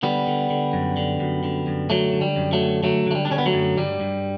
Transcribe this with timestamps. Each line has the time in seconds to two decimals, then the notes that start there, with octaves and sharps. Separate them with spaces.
0.03 D3 G3 B3
0.27 D3
0.50 D3
0.73 F#2
0.97 D3
1.20 F#2
1.44 D3
1.67 F#2
1.90 D3 F#3 A3
2.13 D3
2.21 G3
2.36 F#2
2.53 F#3 A3
2.61 D3
2.83 D3 F#3 A3
3.06 D3 A3
3.15 G3
3.25 D4
3.31 D3 C#4
3.38 B3
3.46 F#3 A3
3.53 F#2
3.77 G2 G3
4.00 G2